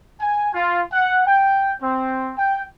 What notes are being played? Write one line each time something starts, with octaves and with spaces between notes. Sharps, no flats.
G#5
F4
F#5
G5
C4
G5